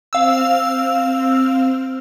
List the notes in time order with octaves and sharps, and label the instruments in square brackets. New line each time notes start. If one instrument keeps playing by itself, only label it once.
[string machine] C4 F6 [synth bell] F5 E6